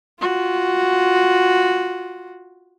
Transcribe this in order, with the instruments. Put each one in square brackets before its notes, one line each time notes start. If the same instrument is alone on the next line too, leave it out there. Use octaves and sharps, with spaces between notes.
[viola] F4 F#4